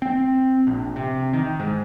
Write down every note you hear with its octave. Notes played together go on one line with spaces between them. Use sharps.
C4
A#1
C3
D#3
G#2